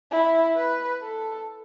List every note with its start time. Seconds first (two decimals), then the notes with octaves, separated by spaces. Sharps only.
0.11 E4
0.57 B4
1.03 A4